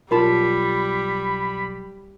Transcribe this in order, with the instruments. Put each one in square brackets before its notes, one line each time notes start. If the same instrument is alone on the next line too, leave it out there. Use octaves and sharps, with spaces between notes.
[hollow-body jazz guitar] B1 F4 A5 [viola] G3 [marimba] A#4 [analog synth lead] B5